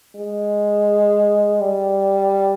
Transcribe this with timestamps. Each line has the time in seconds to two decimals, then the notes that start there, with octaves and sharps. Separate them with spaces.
0.15 G#3
1.61 G3